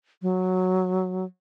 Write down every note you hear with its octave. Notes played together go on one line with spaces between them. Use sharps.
F#3